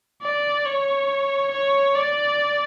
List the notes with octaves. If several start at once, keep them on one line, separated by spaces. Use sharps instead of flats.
D5
C#5
C#5
D5